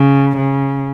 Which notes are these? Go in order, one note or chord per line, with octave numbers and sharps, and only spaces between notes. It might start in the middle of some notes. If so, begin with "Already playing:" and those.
Already playing: C#3
C#3